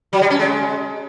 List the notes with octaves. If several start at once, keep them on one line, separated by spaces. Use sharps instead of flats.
F#3
G3
C#4
G#3